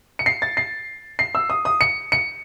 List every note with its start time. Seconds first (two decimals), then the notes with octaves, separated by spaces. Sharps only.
0.19 C#7
0.26 C7
0.42 A6
0.57 C7
1.19 C7
1.35 E6
1.50 D#6
1.65 D#6
1.81 C#7
2.12 C#7